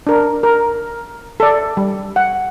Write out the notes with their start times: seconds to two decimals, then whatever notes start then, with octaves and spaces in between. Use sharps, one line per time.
0.07 D4 A#4
0.43 A#4
1.40 A4 D5
1.77 G3
2.16 F#5